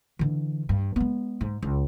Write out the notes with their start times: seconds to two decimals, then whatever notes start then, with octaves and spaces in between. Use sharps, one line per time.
0.19 D3 E3
0.69 G2
0.96 G#3 B3
1.41 G#2
1.62 C#2